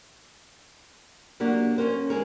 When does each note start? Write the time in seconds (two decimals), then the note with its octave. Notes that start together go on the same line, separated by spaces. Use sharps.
1.40 F#3 A#3 D4 F#4 G4
1.78 C#4 A#4 C5
2.10 G#3 G#4 A#4